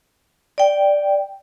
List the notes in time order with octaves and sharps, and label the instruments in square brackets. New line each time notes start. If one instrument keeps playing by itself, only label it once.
[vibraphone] D5 G5